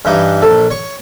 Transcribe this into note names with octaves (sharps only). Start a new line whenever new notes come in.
G2 E3 D#4
A#1 A4
C#5 C#6